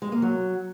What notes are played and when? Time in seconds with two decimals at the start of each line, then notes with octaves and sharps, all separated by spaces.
0.02 G#3
0.12 A#3
0.22 F#3